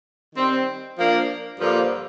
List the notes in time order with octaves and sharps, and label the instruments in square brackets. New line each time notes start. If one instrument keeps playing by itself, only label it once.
[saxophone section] D#3 G3 C4
F3 A#3 D4
G2 D3 F3 A#3